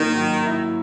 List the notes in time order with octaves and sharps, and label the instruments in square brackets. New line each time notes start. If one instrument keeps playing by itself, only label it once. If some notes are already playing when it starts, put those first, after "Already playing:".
Already playing: [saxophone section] D#3 [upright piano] F#3 A#3 C#4
[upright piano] F#3
E4